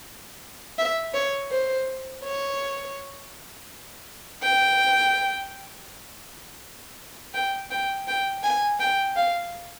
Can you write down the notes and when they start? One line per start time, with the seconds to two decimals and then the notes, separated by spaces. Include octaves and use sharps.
0.78 E5
1.14 C#5
1.51 C5
2.24 C#5
4.42 G5
7.34 G5
7.71 G5
8.08 G5
8.44 G#5
8.80 G5
9.16 F5